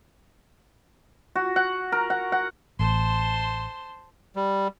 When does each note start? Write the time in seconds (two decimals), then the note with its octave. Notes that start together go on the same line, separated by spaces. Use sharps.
1.35 F#4
1.56 F#5
1.92 A#4
2.10 F#5
2.32 F#5
2.79 A1 C5 A5 C6
4.36 G3